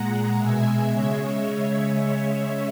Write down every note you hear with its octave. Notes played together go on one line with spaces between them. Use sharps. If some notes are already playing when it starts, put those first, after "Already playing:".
Already playing: A#2 G#3 F#5 A#5
B2 G#3 E5 G#5
C#3 G#3 C#5 E5